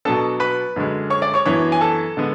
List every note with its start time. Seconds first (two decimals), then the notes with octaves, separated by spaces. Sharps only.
0.05 B2 F#3 B3 D4 A4 A5
0.40 B4 B5
0.76 F#2 D3 G#3
1.10 C#5 C#6
1.22 D5 D6
1.34 C#5 C#6
1.46 F#2 E3 B3 D4 C#5 C#6
1.72 G#5
1.81 A4 A5
2.17 D3 G#3 B3